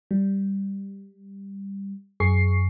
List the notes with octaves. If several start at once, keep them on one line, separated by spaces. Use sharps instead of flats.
G3
F#2 G#4 C#6 C7